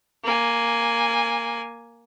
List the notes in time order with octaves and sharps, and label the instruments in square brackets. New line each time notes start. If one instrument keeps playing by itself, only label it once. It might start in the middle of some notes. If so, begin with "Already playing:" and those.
[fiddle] A#3 G#5